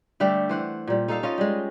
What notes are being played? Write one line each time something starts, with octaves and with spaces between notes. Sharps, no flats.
D3 G3 A3 G4
E3 C5 F#5
A#2 G3
D#4 A4 F5
C#4 F4 D#5
G3 G#3